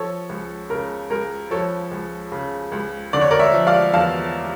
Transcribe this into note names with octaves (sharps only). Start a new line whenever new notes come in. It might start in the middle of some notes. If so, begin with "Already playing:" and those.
Already playing: F3 A4 C#5
C#2
C#3 A#4
C#2 A#4
F3 A4 C#5
C#2
C#3
C#2
D3 D5
C#5
A#4 D5
C#5 E5
F3
D5 F5
E2 F5 A5